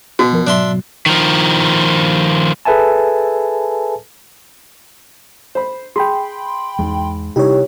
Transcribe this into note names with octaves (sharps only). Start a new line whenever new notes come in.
B2 F#4
F#2 F3 A#4
G#2 B2 F#3 D4 E5 C6
D#3 F3
G#4 A4 B4 E5 G#5 A5
C5 B5
G#4 G5 B5 C6
E2 G#2 G#3
C3 G3 D#4 E4 G4 C#5